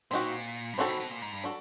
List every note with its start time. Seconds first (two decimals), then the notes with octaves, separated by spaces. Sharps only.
0.11 A#2 C4 D#4 F#4
0.74 G2
0.77 G#2 C4 D#4 F#4 A4
0.89 B2
1.00 B2
1.11 A#2
1.22 G#2
1.33 G2
1.44 D4 F#4 A4